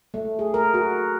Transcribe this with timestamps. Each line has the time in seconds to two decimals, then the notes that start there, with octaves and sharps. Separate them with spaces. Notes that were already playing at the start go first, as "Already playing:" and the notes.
0.14 A3
0.39 G#4
0.54 A#4
0.74 F#4